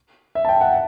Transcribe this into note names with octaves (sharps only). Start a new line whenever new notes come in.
E5
A5
G5
F#5